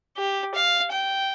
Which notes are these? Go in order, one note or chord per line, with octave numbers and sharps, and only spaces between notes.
G4
F5
G5